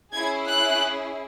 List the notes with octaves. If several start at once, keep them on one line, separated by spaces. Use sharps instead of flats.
C#4 E4 G#4 G#6
F#6